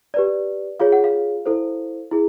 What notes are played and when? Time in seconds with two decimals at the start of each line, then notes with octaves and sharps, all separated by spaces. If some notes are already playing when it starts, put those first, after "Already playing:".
0.14 G4 B4 D5
0.80 F4 G#4 C#5 F5
0.92 F#5
1.04 F5
1.46 E4 A4 C5
2.11 E4 G#4